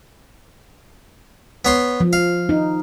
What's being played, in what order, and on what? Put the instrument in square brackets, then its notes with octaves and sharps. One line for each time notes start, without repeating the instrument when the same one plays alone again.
[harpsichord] B3 C#5 C6
[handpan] F3
[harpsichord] F5
[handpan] D#4